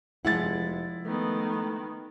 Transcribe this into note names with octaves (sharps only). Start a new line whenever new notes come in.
F1 F3 G#3 E4 F#5 A6
D#3 A3 B3